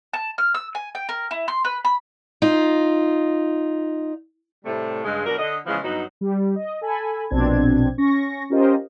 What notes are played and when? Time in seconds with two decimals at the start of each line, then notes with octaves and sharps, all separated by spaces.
0.13 A5
0.38 F6
0.55 E6
0.75 G#5
0.95 G5
1.09 A#4
1.31 E4
1.48 C6
1.65 B4
1.85 B5
2.42 D#4 F4
4.65 A2 C3 G3 A3
5.04 G2 C#3 G#3
5.26 B2 F#3 D4 A#4
5.39 D3 D#5
5.66 C#3 E3 F3 G#3 B3
5.84 G2 F#3 B3 D#4
6.21 G3
6.56 D#5
6.81 A4 G#5 B5
7.30 A#1 B2 C4 D4 G#6
7.98 C#4 C#6 A#6
8.50 C#4 F4 G4 A#4 C5 D#5